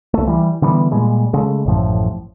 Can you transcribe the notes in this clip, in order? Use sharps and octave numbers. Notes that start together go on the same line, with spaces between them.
C2 A3
E3 G3
D3 E3 G3 B3
A#2 G3 G#3
C#3 G#3 A3
A1 F#2 A2 F3